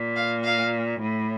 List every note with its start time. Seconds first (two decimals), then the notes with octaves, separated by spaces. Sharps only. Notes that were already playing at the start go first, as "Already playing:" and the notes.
Already playing: A#2
0.16 F5
0.44 F5
1.01 A2